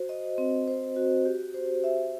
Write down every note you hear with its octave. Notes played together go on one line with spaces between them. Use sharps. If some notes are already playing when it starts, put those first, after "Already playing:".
Already playing: F#4 C5
D#5
C4
C5
F#4
G4
C5
E5